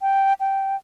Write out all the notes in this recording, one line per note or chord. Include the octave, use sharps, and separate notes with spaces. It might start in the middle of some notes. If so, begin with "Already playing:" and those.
G5
G5